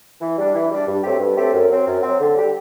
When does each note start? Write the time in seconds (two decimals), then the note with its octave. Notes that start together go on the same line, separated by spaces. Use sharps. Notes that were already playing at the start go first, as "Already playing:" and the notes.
0.21 E3
0.37 G3 D4
0.54 E3
0.71 G3 D4
0.87 G2
1.04 F#3 A3 C4 G4
1.20 G2
1.36 F#3 A3 C4 G4
1.54 F#2
1.70 F#3 C4
1.87 F#2
2.02 C4
2.08 F#3
2.20 D3
2.36 G3 D4 G4